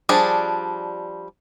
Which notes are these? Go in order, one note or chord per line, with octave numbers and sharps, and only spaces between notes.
F3 G3 D4 G#4